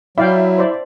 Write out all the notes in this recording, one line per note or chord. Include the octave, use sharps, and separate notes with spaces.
F#3 E4 D5 F5 G5
C5 D5